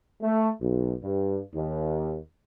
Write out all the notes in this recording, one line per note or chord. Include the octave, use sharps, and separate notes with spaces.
A3
B1
G2
D#2